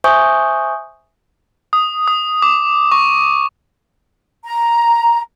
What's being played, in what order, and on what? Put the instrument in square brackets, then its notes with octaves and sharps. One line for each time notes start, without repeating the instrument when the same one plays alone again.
[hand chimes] C5 E5 G#5 C#6 D#6 G6
[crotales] D#6
D#6
D6
C#6
[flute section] A#5